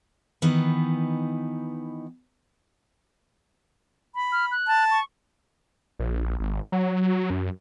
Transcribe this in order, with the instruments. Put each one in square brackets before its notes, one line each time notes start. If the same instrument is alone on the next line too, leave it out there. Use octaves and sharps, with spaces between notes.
[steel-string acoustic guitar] D#3 E3 B3 D#4
[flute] B5
[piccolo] F6
F#6
[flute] A5
[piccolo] C#6
[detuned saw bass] A#1
G#1
F#3
F#2